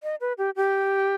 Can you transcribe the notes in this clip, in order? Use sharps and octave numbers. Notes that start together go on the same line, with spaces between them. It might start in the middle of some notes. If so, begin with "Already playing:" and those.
D#5
B4
G4
G4